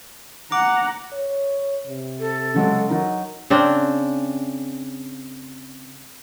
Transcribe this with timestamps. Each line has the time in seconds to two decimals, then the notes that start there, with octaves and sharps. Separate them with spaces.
0.52 F#5 A#5 D6
1.13 C#5
1.87 C3
2.20 A4
2.54 C#3 F#3 G#3
2.89 F#3 D#4 A#4
3.50 C#3 C4 D4